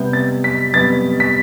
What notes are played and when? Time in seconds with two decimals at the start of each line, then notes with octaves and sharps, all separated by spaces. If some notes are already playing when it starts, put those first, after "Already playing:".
Already playing: C3 G3 B3 G6
0.13 A6
0.44 B6
0.74 C3 G3 B3 A6
1.20 B6